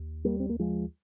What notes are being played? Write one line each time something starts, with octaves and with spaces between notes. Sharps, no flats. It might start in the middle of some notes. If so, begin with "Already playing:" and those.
Already playing: D#2
G3 A#3
C4
A#3
F3 G#3